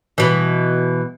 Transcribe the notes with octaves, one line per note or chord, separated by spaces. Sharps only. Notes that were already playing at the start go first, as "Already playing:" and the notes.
B2 E3